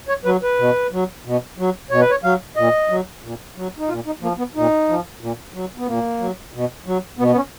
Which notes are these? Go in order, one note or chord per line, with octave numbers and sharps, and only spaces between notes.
C#5
F#3 B4
B4
B2
F#3
B2
F#3
B2 C#5
B4
C#5
F#3 F5
A#2 D#5
F#3
A#2
F#3
D#4
A#2 F4
D#4
F3 A#3
B3
A#2 D#4
F3
A#2
F#3
B3
A#2 A#3
F#3
B2
F#3
B2 B3
B3
C#4